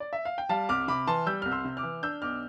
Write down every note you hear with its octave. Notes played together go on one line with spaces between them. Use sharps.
D5
E5
F5
G5
G3 F5 A5
C2 D6 F6
C3 B5 D6
E3 A5 C6
G3 E6 G6
C2 F6
C6 E6
C3
D6 F6
E3
D4 E6 G6
B1 D6 F6